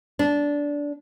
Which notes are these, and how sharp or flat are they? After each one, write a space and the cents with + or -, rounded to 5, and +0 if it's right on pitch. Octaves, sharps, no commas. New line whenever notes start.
D4 -15